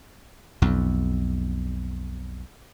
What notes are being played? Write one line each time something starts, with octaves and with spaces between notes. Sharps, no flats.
B1 F2